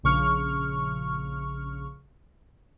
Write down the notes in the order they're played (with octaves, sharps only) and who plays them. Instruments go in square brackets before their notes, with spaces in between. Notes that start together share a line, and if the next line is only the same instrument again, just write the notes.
[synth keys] A#1 C#3 C#6 F6